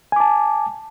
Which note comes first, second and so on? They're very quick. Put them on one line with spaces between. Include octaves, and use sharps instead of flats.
G#5 D6 A5